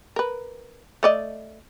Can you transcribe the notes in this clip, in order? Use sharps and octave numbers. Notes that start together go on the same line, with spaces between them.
A#4 B4
A3 D5 D#5